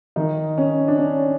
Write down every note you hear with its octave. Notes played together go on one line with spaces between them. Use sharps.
D#3 D#4
C#4
D4
C#4